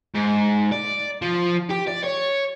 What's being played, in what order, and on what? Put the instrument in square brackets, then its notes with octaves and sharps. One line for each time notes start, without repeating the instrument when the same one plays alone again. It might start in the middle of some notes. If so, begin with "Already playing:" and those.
[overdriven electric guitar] G#2
D5
F3
G4
D5
C#5